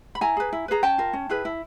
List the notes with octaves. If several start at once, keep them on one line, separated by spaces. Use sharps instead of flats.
B5
E4 G#5 A#5
G#4 B4
E4
G#4 B4 A#5
C#4 G5 A5
F4 A#4
C#4
E4 G#4 B4
E4